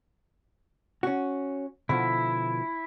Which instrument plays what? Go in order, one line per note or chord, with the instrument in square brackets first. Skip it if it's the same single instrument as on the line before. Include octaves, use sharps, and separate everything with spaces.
[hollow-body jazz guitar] C#4 F#4
[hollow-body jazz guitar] B2 D3 F3 [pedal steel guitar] E4